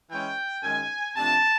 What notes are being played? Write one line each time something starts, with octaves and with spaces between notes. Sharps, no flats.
E3 G#3 C#4 G5
F#2 D#3 G#3 G#5
C3 F3 A3 D4 A5